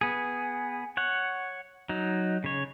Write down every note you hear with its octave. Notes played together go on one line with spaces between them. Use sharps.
B3 G#4
C#5 F#5
F#3 D#4
C#3 C#5